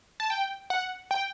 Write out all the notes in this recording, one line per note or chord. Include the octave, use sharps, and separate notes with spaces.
A5
G5
F#5
G5